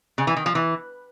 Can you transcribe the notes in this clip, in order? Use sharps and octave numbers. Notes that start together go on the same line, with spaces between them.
C#3
E3
D#3
F3
E3